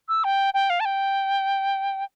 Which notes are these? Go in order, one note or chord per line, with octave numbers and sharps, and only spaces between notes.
E6
G5
G5
F5
A5
G5